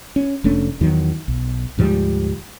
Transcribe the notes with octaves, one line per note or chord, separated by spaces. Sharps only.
C#4
F1 A3 C#4 D4
E2 D#3 F#3
B1
D2 G#2 F3 G3